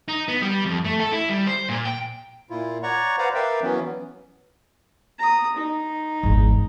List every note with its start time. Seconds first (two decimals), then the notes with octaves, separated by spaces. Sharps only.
0.08 D#4
0.28 B3
0.42 G3
0.65 F2
0.85 A3
1.00 A4
1.12 E4
1.29 G3
1.47 C5
1.69 A#2
1.85 G5
2.50 A#2 E4 F4
2.83 C#5 D5 F#5 A#5 C#6
3.18 B4 C5 D5 F5 F#5 A#5
3.35 A#4 B4 D5 E5 F5 G5
3.63 E3 F#3 B3 C#4
5.19 A#5 D#6
5.56 D#4
6.23 G#1 E2